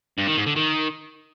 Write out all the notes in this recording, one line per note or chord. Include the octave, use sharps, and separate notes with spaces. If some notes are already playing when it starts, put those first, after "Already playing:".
G2
D#3
G#2
D3
D#3